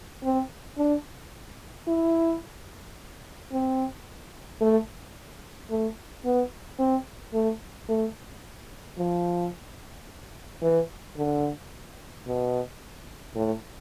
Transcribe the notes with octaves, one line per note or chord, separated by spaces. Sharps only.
C4
D4
E4
C4
A3
A3
B3
C4
A3
A3
F3
E3
D3
B2
A2